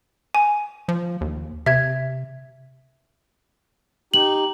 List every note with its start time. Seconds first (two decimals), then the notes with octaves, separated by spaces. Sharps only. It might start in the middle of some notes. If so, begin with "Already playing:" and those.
0.35 G#5
0.89 F3
1.21 D#2
1.66 C3 E5 G#6
4.14 D#4 G4 F#7